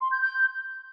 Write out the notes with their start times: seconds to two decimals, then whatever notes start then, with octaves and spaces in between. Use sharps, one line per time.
0.01 C6
0.11 G6
0.22 G6